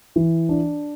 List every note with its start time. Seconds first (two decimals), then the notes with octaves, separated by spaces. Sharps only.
0.16 E3
0.49 D4